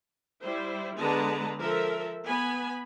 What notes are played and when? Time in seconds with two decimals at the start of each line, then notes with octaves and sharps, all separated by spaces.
0.43 G3 E4 C5
0.98 D3 G#3 B3 B4 A5 A#5
1.60 F3 A4 A#4 E5
2.25 B3 G#5 B5